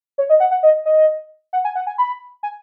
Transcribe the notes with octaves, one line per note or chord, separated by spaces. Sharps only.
C#5
D#5
F#5
F#5
D#5
D#5
F#5
G#5
F#5
G#5
B5
G#5